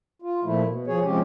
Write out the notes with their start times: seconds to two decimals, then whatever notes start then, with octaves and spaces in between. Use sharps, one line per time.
0.22 F4
0.44 A#2 F3 A3 E4
0.64 B2
0.87 F3 G#4 C#5
1.04 C3 F3 G#3 C#4 G4